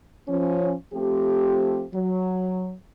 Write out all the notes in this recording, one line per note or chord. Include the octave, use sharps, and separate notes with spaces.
F3 C#4
F3 A3 C4 G4
F#3